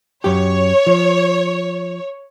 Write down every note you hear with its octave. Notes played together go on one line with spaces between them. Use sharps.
F#2 G4 C#5
F3